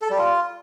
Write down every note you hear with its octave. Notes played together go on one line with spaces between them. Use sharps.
A4
G3
F4